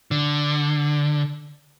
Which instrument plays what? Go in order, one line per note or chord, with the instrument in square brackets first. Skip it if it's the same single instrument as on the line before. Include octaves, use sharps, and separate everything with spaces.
[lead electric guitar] D3